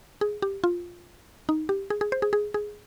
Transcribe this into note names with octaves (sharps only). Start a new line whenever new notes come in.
G#4
G4
F4
D#4
G4
G#4
G#4
C5
G#4
G#4
G#4